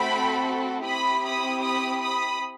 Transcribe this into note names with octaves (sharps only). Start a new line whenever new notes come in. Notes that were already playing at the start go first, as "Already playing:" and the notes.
Already playing: A3 C4 F#4 A4 G5 B5
C4 E4 G4 B5 D#6
B5 D#6
B5 D#6
B5 D#6